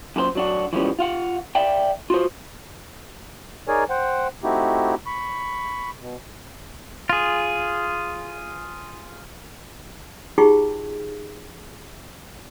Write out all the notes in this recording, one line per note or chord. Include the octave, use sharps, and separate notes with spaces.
F#2 A#2 A4 C5
F#3 D4 F#4
E3 F3 G3 G#3 B3 C#4
F4 F5 F#5
D5 E5 G5
F4 F#4 C5
D#4 G#4 A#4 C#5 D5 G#5
C5 F#5 G5
A3 C4 D#4 E4 F#4 G4
B5 C#6
B2
F4 G#4
D#4 F4 G4 G#4 G5 C#6